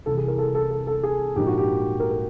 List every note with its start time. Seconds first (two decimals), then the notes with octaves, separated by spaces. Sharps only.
0.06 C2 C3 E3 A4
0.17 G#4
0.28 A#4
0.38 A4
0.55 A4
0.71 A4
0.87 A4
1.03 G#4
1.36 A#1 G#2 F3 A#3 D#4 G4
1.47 F#4
1.58 G4
2.00 A#4
2.11 A#4